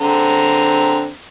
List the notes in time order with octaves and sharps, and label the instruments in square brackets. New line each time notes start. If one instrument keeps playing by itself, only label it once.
[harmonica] D3 C4 A#5